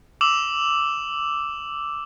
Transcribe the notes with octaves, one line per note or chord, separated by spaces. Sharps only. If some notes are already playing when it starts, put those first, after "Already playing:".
D6 E6 E7 F#7